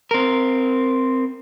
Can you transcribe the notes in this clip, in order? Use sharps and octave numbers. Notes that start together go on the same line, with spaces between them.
C4 A#4